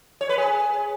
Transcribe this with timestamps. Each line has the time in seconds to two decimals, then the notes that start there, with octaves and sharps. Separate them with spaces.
0.21 C#5
0.29 B4
0.38 G#4